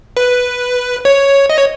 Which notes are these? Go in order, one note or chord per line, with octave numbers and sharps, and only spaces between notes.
B4
C#5
D#5
C#5